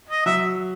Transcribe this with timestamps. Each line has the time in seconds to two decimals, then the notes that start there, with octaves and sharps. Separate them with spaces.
0.10 D#5
0.26 F#3 E5